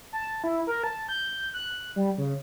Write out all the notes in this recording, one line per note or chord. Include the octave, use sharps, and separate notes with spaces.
A5
E4
A#4
A5
G6
F#6
G3
C#3